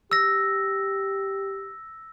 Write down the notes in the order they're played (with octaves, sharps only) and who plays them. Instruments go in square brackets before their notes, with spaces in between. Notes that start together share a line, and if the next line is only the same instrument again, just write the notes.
[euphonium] G4 [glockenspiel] E6 A#6